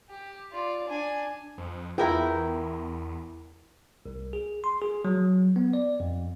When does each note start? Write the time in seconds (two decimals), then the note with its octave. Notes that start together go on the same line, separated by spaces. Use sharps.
0.10 G4
0.52 F4 D5
0.88 D4 G#5
1.58 F2
1.98 E2 E4 F4 G#4 A#4 B4 G5
4.06 C2
4.33 G#4
4.64 C6
4.82 G#4
5.05 F#3
5.56 B3
5.73 D5
6.00 F2